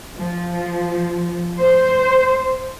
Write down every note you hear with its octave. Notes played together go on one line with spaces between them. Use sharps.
F3
C5